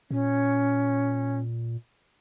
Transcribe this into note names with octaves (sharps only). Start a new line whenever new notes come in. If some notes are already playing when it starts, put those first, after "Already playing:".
A#2 C#4